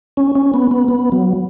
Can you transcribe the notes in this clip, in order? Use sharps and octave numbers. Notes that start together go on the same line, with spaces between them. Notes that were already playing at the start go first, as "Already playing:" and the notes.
C#4
C#4
B3
B3
B3
F#3